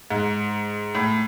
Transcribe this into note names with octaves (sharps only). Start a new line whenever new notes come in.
G#2
A2